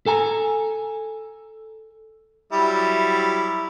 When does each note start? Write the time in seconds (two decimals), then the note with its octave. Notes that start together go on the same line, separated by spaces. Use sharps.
0.06 A4 G#5 A#5
2.52 F#3 G3 E4